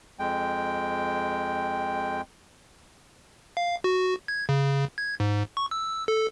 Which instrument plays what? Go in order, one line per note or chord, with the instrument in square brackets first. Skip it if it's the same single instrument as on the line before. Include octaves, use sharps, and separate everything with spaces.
[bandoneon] F2 G#3 G5
[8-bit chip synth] F5
F#4
G#6
C#3
G#6
G#2
C#6
E6
A4